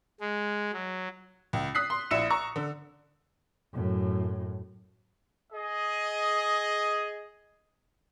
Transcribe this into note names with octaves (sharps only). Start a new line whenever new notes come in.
G#3
F#3
C#2
D#6 F#6 B6 C7
C6
A#1 E4 E6 C#7 E7
A#5 C#6
D3
F#2 A2
G#4 D#5